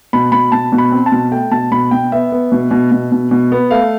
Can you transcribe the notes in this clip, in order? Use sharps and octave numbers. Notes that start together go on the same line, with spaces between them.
B2 B5
B2 B5
B2 A5
B2
B5
C4
A5
B2
A3 G5
B2 A5
B2 B5
B2 G5
B3 E5
B3
B2
B2
B2
B2
B2
B3
A3 F5